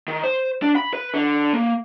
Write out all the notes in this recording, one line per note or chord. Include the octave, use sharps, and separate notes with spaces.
D#3
C5
D4
B5
B4
D3
A#3